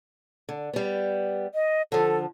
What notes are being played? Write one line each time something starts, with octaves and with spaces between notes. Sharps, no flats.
D3
G3 B3
D#5
D3 F3 A4